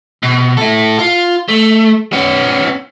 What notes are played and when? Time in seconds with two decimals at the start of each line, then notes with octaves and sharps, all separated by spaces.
0.23 B2
0.57 E4 A4
0.99 F4
1.49 A3
2.13 B3 C#4